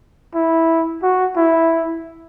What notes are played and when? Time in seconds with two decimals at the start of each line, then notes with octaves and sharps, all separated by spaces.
0.35 E4
1.03 F#4
1.36 E4